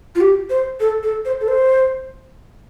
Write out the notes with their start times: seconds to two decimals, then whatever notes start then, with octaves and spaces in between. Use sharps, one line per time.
0.15 F4
0.21 G4
0.50 C5
0.80 A4
1.03 A4
1.25 C5
1.41 A4
1.48 C5